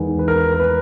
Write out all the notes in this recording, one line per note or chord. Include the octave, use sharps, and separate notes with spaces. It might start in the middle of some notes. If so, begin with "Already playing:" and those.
Already playing: E2 D#3 G#3 D#4
B4
A#4
A#4
B4